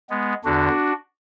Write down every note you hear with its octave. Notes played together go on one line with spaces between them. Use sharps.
G#3 B3
E2 D3 D4 F#4